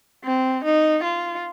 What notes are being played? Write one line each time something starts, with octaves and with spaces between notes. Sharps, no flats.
C4
D#4
F4